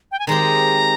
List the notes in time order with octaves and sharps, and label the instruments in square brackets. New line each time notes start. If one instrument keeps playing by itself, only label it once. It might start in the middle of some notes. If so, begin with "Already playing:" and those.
[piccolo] G5
G#5
[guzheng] D#3 G#3 C4 G4 [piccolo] A#5